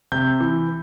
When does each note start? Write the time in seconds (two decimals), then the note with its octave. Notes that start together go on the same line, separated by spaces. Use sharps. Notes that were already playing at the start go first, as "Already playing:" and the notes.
0.12 C3 G6
0.40 E3